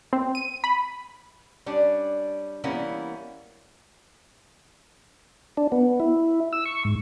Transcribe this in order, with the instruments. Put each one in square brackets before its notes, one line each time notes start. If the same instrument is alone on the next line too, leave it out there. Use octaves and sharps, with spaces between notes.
[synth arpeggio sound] C4
D#7
B5
[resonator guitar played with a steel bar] G3 C#4 D4
E3 G3 A#3 B3 C#4 E4
[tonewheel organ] D4
B3
E4
E6
C#6
G#2